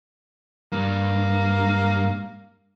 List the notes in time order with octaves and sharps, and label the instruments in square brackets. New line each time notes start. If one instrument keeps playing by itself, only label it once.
[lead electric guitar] G2 [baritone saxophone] A#3